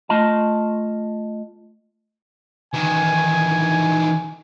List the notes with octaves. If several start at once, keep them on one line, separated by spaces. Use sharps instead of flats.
A3 F4 D#5 A5
D#3 E3 G#5